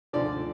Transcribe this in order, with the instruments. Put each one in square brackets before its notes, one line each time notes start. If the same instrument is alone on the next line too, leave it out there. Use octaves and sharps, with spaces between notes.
[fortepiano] D2 D3 F3 D5